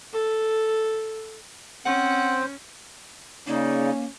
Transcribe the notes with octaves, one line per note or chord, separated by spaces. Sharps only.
A4
C4 C#4 C5 F#5
C#3 A#3 C#4 D#4 D5